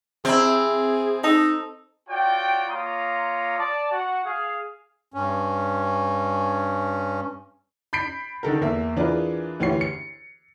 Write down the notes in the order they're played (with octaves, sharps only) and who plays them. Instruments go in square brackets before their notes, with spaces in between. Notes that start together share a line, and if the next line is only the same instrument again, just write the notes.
[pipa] C3 E4 [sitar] C4 [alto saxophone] G#4
[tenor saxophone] D#4 [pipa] A4
[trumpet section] F4 F#4 C#5 D5 G5
A#3 F4 C#5 F5 A#5 D#6
D5 A5
F#4 F#5
G#4 F5
[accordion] G2 C#4
[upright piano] B5 G6 B6 C7 D7
D3 D#3 A4 A#4
E2 A#3 E5
E3 D4 F4 G#4 A#4 B4
D2 E3 G4 C#5 C7
C#7